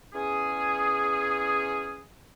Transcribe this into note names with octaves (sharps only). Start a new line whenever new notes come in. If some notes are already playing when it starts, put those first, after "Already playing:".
E2 C#4 G#4